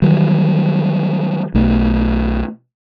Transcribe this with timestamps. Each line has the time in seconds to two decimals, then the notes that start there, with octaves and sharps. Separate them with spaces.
0.02 D#3 E3 F#3 G3
1.54 B1 A3